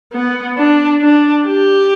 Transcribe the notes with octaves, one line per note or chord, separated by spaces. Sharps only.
B3
D4
D4
G4